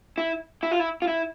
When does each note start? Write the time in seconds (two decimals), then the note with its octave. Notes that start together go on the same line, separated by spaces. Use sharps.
0.18 E4
0.63 E4
0.71 F4
0.80 E4
1.02 F4
1.07 E4